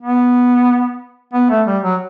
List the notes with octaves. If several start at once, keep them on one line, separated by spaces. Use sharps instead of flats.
B3
B3
A3
G3
F#3